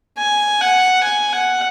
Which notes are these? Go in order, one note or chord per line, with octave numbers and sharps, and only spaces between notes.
G#5
F#5
G#5
F#5